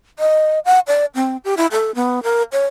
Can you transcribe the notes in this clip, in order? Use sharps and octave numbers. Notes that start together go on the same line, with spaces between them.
D#5
F#5
D5
C4
G4
E4
A4
B3
A#4
C#5